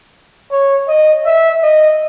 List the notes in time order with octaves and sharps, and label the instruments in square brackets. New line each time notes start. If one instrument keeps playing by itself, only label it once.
[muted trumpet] C#5
D#5
E5
D#5